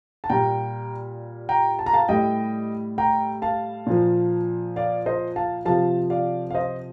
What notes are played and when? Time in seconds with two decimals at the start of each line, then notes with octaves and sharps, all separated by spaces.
0.24 A5
0.30 A#2 G3 G5 A#5
1.49 G5 A#5
1.79 A5
1.86 A#5
1.93 F5 A5
2.09 A2 G3 D#5 G5
2.98 G5 A#5
3.42 F5 A5
3.87 A#2 F3
4.76 D5 F5
5.06 C5 D#5
5.36 F5 A5
5.65 C3 F3 F5 A5
6.10 D5 F5
6.50 F5
6.54 C5 D#5